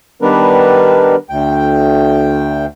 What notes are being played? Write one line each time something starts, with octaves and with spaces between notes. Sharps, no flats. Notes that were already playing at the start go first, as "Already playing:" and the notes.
D#3 G3 B3 D4 A#4 B4
D2 G5